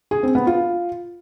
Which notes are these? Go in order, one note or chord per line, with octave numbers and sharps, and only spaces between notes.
G#4
C4
B3
F4